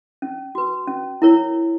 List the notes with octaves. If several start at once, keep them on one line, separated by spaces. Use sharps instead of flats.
C#4
F#4 B4
C#4
E4 A#4 C#5